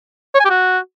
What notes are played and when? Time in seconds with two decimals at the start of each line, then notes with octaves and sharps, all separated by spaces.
0.35 C#5
0.40 G#5
0.45 G4
0.50 F#4